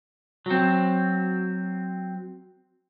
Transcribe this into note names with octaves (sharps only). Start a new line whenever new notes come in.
F#3 C4